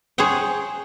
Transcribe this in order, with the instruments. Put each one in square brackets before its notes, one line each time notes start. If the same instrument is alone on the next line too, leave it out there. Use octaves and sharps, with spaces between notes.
[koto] G#4 C5 C#5 F#5 G5